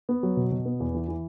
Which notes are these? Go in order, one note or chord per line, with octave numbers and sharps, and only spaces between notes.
B3
F#3
B2
B2
B3
E2
E3
E3